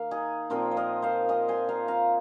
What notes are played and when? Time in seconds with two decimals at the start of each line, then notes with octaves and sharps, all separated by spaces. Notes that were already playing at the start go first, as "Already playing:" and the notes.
Already playing: D#3 A#3 F5
0.11 D#4 G#4
0.50 A#2 F3 C4 F4 A#4
0.71 C5
0.77 A#4 D#5
1.02 C5 F5
1.29 D#5 G#5
1.48 G#5 C6
1.69 F5 A#5
1.88 F5 A#5